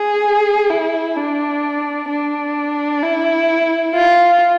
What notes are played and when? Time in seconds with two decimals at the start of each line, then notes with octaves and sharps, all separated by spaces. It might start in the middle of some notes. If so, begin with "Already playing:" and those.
Already playing: G#4
0.70 E4
1.16 D4
2.09 D4
3.02 E4
3.94 F4